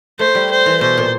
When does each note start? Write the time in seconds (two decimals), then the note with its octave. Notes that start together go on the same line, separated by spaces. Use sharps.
0.19 A3 C5
0.35 G3
0.51 C5
0.66 E3
0.81 B2 C5
0.97 A#2